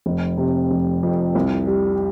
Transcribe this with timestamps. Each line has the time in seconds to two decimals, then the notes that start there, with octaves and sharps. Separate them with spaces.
0.06 F1
0.37 C3
0.71 F1
1.03 F2
1.35 C2
1.67 G3